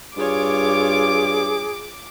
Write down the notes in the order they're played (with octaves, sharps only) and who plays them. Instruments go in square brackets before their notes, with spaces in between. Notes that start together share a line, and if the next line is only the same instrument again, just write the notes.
[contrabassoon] G2 [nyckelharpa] F4 C#5 [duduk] G#4 [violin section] D6